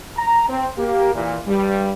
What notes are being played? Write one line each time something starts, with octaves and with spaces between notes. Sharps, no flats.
A#5
C4
A#3 G4
A#2 E3
G2 G3